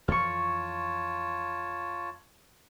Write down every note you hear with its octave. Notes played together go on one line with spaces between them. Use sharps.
F2 E3 F3 F4 C#5 A5 C#6 F6